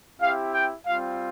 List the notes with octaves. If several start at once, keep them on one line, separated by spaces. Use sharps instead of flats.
C4 E4 G4 F5
G5
G3 C4 F4 F5